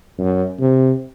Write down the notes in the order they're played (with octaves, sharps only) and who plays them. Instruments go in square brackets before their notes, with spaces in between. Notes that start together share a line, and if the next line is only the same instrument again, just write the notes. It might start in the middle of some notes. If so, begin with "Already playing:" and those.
[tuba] F#2
C3